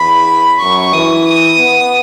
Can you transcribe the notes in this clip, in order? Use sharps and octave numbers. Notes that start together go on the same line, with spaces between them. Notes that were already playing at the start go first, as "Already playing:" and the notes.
Already playing: E2 B5
F#2 C#6
E3 D#6
D#6
B3